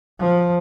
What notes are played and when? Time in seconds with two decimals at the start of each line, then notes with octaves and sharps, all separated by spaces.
0.19 F3